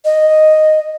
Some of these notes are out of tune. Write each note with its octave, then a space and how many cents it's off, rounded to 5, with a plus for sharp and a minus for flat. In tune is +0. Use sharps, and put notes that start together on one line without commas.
D#5 -5